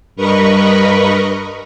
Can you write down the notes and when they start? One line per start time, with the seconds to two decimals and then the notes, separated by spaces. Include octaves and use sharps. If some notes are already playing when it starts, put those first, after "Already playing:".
0.16 G2 A#4 B4 D#5 B5 C#6